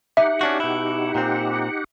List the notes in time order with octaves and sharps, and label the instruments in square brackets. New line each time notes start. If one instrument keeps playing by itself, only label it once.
[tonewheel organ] D#4 G4 F#5 [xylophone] E5
[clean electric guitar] C#4 D4 F#4
B2 E4
A#2 C4